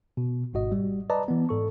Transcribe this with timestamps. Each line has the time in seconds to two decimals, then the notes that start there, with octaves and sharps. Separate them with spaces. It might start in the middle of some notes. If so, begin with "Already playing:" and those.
0.17 B2
0.53 G#1 G#2 F#4 D#5
0.72 G3
1.10 B4 D5 D#5 A5 A#5
1.28 E3 B3
1.49 G#2 A4 C#6